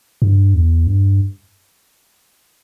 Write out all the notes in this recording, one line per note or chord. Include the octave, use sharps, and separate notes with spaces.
G2
E2
G2